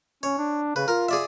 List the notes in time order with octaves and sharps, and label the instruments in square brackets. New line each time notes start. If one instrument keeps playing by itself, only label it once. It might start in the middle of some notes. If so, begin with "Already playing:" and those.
[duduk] C#4 [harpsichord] C#5
[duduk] D4
[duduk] C#3 [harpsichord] B4
[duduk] F4 [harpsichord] A#4
[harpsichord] G#4 D5 E5